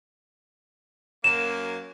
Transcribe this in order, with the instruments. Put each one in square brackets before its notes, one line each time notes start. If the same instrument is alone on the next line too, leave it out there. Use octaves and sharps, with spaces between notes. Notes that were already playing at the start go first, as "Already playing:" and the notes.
[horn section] F#2 F#3 A#3 [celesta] E7